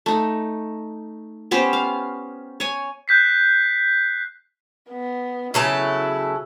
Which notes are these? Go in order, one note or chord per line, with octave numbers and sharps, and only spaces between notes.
A3 D#4
B3 C#4 G4 C5
F5
C#5 G#5
F#6 G6 B6 C7
B3
C#3 F#3 E4 A4